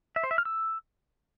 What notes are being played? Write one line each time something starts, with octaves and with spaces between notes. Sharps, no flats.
E5
C5
E5
F6
E6